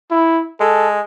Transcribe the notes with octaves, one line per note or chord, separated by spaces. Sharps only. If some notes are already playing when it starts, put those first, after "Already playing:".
E4
G#3 A4